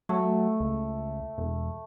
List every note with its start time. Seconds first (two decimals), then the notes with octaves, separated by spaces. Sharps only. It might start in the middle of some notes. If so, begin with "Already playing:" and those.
0.09 F#3 A3
0.60 C#2
1.38 E1